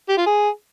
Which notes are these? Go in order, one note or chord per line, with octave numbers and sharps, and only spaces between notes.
G4
F4
G#4